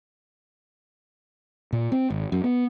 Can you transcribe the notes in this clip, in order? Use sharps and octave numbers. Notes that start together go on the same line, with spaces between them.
A#2
C4
G#1
F#2
B3